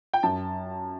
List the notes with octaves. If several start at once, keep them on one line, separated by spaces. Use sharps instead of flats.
G5
F#2 A5